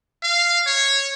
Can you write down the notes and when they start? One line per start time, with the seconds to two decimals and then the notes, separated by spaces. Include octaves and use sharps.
0.23 F5
0.66 C#5